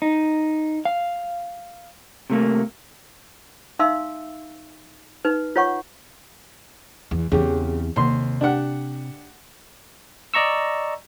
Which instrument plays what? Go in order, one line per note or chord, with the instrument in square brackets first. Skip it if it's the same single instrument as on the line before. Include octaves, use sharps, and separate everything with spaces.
[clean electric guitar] D#4
F5
C3 A3 A#3
[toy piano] D#4 E5 F5 C6 E6
D#4 B4
F4 C#5 F#5 C#6
[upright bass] E2
[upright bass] E2 C4 [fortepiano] C#3 G4
[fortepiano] D#2 C6 [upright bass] C3
[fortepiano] D4 G4 F#5
[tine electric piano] D5 D#5 A#5 C#6 E6